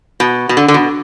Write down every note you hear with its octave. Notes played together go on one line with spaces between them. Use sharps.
B2
B2
D3
D3
B2